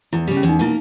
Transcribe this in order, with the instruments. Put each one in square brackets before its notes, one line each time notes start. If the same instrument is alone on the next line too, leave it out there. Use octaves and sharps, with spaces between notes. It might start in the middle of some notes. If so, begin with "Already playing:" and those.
[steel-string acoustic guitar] E2 [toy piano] E4
[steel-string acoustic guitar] C#3 G3
[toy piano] C#4
[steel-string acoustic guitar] E2
[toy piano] D#4
[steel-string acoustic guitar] B2 A#3 [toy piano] E4